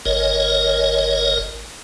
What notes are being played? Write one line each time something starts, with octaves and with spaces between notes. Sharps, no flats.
G#1 A#4 C#5 D#5